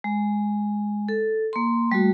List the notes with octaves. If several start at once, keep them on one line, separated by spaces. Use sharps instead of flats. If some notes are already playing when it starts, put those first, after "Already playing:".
G#3
A4
A#3 C6
G3 A3 F#4